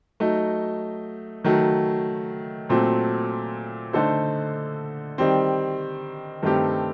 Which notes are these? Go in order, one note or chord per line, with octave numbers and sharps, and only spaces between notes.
F#3 A3 D#4
D#3 F#3 A3
A#2 F#3 A3 C4
D3 A3 D#4 A4 C5
D#3 G3 C4
G2 D#3 A3 C4 G4